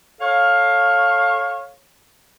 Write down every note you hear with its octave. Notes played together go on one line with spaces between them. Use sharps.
A4 C#5 F5